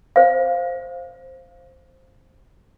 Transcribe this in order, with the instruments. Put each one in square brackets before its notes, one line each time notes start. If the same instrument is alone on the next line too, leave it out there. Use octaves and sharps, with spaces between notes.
[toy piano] C5 F5